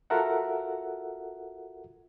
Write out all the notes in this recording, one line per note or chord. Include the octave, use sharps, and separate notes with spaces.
F4 F#4 A4 A#4 E5 F#5